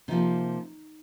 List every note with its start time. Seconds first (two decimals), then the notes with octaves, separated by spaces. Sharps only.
0.08 C3 F3 A#3 D#4